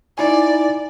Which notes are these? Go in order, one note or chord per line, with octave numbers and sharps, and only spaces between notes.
D#4 E4 D5 G#5